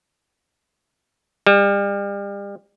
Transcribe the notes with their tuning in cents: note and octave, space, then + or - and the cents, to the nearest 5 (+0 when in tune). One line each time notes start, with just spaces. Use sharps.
G3 +35